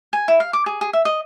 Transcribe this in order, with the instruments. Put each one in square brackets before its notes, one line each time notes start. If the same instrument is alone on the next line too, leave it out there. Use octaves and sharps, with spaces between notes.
[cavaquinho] G#5
E4
F5
D6
G#4
G#4
E5
D#5